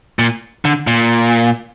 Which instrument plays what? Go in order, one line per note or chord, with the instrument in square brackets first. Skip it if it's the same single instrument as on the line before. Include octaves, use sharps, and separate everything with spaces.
[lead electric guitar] A#2
D3
A#2